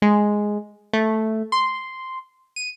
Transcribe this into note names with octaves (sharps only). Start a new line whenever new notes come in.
G#3
A3
C6
D#7